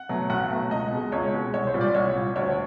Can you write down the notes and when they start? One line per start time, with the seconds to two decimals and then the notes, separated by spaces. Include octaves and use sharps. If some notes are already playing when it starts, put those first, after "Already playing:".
Already playing: F#5
0.09 B2 F#3 A3
0.30 B1 F#5
0.50 B2 F#3 A3
0.71 C#2 D#5
0.91 B2 G#3
1.12 C#2 C#5
1.33 B2 G#3
1.54 C2 C#5
1.67 C5
1.74 A#2 G3
1.81 D5
1.95 C2 C#5
2.15 A#2 G3
2.36 D2 C#5